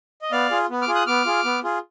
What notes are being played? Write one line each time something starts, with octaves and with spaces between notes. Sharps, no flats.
D#5
B3 D5 F5
F4 G#4
B3
D6 F6
F4 G#4
D#6 F#6
B3 D6 F6
F4 G#4
B3
F4 G#4